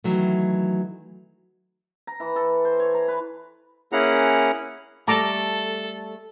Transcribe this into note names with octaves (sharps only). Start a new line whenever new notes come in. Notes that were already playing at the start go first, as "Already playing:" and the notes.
D#3 E3 F#3 A3
A#5
E3
A4
C5
C#5
A#5
B4
A#3 C#4 E4 G#4 F#5 A#5
G3 A3 A4 A5 A#5 D6